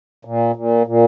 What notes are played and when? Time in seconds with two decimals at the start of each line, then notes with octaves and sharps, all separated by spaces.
0.25 A#2
0.56 A#2
0.87 A#2